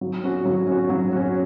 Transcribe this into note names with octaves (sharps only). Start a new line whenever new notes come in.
F#3
C#4 F#4
F#3
C#4 F#4
F#3
C#4 F#4